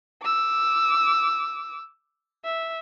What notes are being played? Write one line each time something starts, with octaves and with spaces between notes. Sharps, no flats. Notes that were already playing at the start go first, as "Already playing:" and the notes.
D6 E6
E5